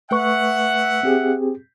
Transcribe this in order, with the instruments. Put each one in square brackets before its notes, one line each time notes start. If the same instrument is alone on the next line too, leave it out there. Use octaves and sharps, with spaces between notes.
[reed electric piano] A3 B4 C#6 [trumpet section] E5 F#5
[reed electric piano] C4 G4 G#4